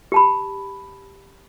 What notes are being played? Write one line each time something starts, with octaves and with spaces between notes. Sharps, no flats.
G4 A5 B5